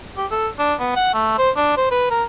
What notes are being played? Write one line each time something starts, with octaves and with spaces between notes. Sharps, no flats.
G4
A4
D4
B3
F#5
A3
C5
D4
C5
B4
A#4